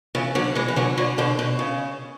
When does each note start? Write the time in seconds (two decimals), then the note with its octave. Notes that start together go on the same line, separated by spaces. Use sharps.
0.15 C#3 E3
0.35 D3 F#3
0.55 E3 G#3
0.68 E3
0.76 D3 F#3
0.97 D3 F#3
1.18 B2 D3
1.39 B2
1.59 C#3